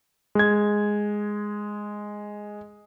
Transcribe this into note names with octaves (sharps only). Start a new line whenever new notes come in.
G#3 G#6